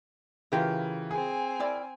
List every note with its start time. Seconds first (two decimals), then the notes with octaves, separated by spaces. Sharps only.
0.52 C#3 E3 F4 G4 A#4
1.11 C4 G#4 G#5
1.60 E4 A#4 D5